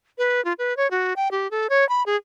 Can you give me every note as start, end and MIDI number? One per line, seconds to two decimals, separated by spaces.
0.18 0.43 71
0.45 0.53 65
0.58 0.76 71
0.77 0.90 73
0.91 1.13 66
1.16 1.31 79
1.31 1.50 67
1.51 1.67 69
1.70 1.87 73
1.89 2.03 83
2.06 2.16 68